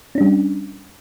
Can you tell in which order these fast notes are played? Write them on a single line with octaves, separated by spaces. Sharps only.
C#4 D4 G3